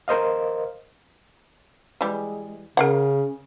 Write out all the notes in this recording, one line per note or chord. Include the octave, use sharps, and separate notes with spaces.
A#4 C5 D#5 F5
E3 G3 G#3
C#3 C#4 A#4 F5 F#5